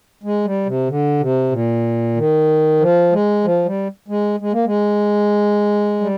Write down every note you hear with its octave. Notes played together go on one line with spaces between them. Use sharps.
G#3
G3
C3
D3
C3
A#2
D#3
F3
G#3
F3
G3
G#3
G#3
A#3
G#3
G3